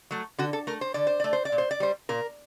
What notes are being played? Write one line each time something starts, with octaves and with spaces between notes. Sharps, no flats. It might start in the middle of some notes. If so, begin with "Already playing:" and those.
F#3 A3
D3 F#4
A4
A3 A#4
C5
D3 D5
C5
A3 D5
C5
D5
A#2
C5
D5
G3 C5
A#2 A#4